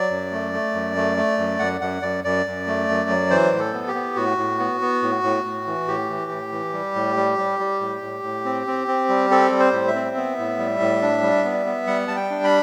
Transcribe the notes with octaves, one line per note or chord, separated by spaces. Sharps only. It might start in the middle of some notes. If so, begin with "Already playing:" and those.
Already playing: F#3 D5
F#2
A3
A3
F#2
A3
A3
F#2
F#2 F#5
F#2 F#5
F#2 D5
F#2 D5
F#2
A3
F#2
F#3
E3 C5
A2
A4
B3
G4
B3
A2 F#4
A2
B3
B3
A2
A2
A2
E3
A2 G4
E3
A2
E3
G3
A2
G3
G3
G3
A2
A2
A2
C4
C4
C4
G3
C4 A4
G3
C5
A2
E5
C4
B3
A2
G3
A2
D4
G3
B3
B3
G3 F#5
G3 A5
G5
D4
B5